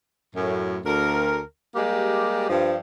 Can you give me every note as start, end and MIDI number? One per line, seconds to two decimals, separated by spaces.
0.35 0.78 42
0.35 0.78 45
0.85 1.40 38
0.85 1.40 70
1.75 2.48 55
1.75 2.48 56
1.75 2.48 58
1.75 2.48 67
2.49 2.76 43
2.49 2.76 53